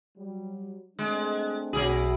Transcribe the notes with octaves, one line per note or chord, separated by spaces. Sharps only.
F#3 G3
G#3 A3 C4 D4
B1 F#3 E4 G#4